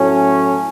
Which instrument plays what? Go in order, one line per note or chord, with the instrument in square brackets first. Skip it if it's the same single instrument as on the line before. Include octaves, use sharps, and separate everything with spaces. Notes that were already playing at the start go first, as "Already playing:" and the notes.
Already playing: [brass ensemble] A2 F#3 A3 C#4